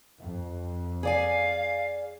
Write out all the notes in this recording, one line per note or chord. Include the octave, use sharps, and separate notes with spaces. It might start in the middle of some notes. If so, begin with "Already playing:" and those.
F2
G#4 D5 F5 G#5